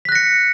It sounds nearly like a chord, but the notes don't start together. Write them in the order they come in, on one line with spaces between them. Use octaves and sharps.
B6 F#6 A#6 C#7